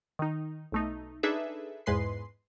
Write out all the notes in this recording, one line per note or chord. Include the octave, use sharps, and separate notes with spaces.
D#3 D#4
B1 A3 D#4
D4 D#4 G#4 A4 B4 E5
E2 G#2 G#3 B4 C6 C7